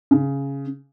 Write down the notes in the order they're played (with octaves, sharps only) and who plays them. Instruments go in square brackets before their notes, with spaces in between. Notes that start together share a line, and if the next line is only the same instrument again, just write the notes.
[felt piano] C#3